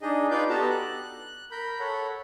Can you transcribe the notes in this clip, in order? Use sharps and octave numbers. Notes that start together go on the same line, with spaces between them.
D4 D#4 G#4 D#5
D#4 F4 B4 D5 F5 G6
B3 F#4 G4 A4 A5 A#5
F#6
A#4 B5 G6
A4 C#5 F#5 B5